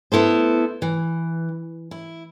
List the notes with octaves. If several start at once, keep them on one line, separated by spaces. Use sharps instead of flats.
B3 E4 A4 C5
E3
E4